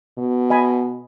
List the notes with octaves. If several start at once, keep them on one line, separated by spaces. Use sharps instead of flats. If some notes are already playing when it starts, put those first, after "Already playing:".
B2
D#5 G#5 B5